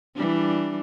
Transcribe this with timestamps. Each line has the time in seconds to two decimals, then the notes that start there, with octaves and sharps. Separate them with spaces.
0.15 E3 G3 D4